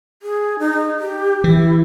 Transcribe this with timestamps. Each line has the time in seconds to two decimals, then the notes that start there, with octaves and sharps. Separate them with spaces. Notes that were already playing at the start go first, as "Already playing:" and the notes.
0.23 G#4
0.59 D#4
0.99 G4
1.44 E3 E4